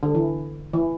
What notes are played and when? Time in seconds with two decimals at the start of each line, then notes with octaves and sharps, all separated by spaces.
0.03 D3
0.15 E3
0.73 E3